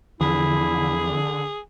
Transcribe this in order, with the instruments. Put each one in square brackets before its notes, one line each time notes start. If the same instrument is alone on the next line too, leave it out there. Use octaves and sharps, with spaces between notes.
[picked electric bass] E2 F3 [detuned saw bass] D3 [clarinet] E4 [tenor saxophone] G#4